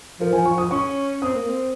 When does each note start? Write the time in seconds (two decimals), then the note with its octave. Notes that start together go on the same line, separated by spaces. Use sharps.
0.20 F3 A#4
0.33 F3 G#5
0.45 F3 C#6
0.58 F3 D#6
0.71 C#4 C#6
1.22 C4 D#6
1.35 A#3
1.48 C4